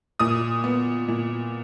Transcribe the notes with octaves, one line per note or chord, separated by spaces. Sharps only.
A#2 D#6
B3
A#2